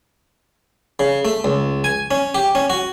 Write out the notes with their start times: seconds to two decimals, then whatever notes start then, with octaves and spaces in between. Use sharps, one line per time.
0.99 C#3
1.25 A3
1.44 C#2
1.84 G#5
2.11 C#4
2.35 G4
2.55 C#4
2.70 F#4